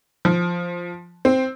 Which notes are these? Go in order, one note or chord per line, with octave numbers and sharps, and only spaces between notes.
F3
C4